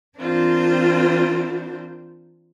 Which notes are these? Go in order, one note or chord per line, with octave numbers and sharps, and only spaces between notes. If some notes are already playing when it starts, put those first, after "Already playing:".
E3 C4 D4 F4 A#4 C5